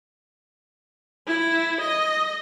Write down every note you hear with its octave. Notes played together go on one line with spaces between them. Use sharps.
E4
D#5